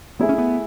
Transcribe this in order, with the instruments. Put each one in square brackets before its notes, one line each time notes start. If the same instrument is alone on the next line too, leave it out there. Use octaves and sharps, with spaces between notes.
[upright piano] A3 E4 G#4 [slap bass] B3
[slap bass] C#4
B3